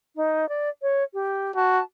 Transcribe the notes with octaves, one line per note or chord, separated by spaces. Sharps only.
D#4
D5
C#5
G4
F#4 A5